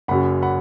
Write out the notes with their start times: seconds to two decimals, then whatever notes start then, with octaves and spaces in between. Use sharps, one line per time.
0.08 F#1 F#2 F#3 F#5 B5
0.43 F#5 B5